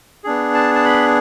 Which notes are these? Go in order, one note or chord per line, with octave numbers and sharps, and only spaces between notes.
B3 D4 G#4
A5
A5
B5